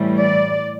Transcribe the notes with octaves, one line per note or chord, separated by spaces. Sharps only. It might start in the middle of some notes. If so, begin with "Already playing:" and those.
Already playing: A2 E3 G3
D5